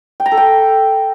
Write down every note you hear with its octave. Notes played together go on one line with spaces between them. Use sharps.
G5
A#5
A4
G5